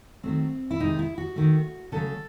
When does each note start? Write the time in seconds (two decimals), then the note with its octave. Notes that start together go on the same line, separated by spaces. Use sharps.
0.23 D#3 F#3 A3 C4
0.71 E4
0.80 C3 D#3 G#3 D#4
0.99 E4
1.18 F#4
1.36 D#3 A3
1.92 C#3 F#3 A3 A4